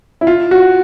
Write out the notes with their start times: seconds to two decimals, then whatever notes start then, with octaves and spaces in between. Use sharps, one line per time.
0.21 E4
0.27 F4
0.51 F#4